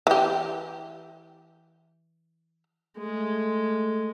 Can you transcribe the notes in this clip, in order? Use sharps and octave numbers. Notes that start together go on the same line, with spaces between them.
E3 G4
G#3 A3